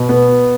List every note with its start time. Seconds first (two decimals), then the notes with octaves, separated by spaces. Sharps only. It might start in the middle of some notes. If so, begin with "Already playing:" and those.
Already playing: B2
0.09 B3